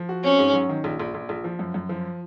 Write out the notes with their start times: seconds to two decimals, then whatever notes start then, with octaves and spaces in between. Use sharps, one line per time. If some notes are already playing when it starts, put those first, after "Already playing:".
Already playing: F3
0.09 F#4
0.24 C4 C#4
0.38 G#2
0.53 F#3
0.69 D#3
0.84 A#1
1.00 A#1
1.14 A#1
1.29 A#1
1.44 F3
1.59 F#2
1.74 F#2
1.89 F3